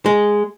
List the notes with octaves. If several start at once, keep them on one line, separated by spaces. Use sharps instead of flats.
G#3